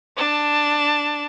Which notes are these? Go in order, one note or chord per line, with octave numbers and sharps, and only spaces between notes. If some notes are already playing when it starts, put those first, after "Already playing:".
D4 A5